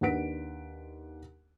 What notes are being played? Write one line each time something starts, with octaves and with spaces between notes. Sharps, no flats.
D#2 D4 B4 F#5 B6 D7